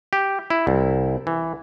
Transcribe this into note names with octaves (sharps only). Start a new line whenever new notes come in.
G4
E4
C2
E3